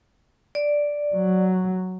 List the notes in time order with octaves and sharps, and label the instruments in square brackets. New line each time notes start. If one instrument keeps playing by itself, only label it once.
[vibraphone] D5
[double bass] F#3